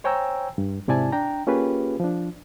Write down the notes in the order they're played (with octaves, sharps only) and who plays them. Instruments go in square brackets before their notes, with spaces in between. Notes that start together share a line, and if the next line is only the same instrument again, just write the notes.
[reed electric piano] C5 C#5 G5 G#5 A#5 E6
G2
G#2 C3 E4 D5 G#5 A5
D4 G5 A#5
A#3 C#4 F4 G4 G#4 B4
F3 D4